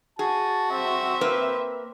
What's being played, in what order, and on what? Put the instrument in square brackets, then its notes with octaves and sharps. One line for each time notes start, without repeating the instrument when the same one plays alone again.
[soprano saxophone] F#4 [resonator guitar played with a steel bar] G#4 [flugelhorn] A5
[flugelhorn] C4 [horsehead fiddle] E5
[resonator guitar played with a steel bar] A#3 B4